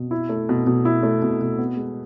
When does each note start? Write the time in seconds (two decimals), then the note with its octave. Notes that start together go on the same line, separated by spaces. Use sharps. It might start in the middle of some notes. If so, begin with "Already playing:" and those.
Already playing: B2
0.11 E4
0.29 A3
0.49 B2
0.67 B2
0.85 E4
1.03 A3
1.22 B2
1.41 B2
1.58 B3
1.77 G#3